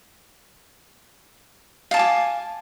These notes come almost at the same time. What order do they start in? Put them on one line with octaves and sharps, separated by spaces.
F5 A5 G#5 D6